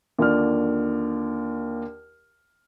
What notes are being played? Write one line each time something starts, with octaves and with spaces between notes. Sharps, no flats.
D#2 D3 F4 D5 F6